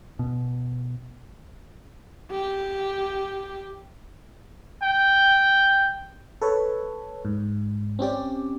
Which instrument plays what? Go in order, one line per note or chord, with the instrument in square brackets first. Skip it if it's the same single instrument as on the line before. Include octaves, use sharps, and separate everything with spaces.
[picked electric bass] B2
[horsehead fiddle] G4
[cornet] G5
[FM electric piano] A4 B4 C#5
G#2
C4 C#4 G4 D5